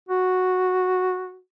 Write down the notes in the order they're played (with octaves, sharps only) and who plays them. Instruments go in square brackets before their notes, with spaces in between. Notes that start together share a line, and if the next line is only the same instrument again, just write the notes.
[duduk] F#4